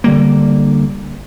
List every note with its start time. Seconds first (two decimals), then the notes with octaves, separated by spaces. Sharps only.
0.04 D3 G3 A#3